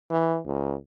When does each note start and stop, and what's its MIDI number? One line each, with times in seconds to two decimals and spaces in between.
0.10 0.38 52
0.46 0.75 37